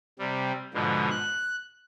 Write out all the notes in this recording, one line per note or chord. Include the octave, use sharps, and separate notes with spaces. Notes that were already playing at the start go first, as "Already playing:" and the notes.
C3 G3
G#2 B2 D3 F3
F#6